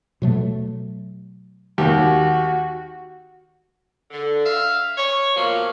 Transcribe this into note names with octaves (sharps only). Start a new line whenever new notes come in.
B2 F#3 A3
D#2 F#4 G4
D3
E5 F5
C#5
B2 F3 F#3 A#3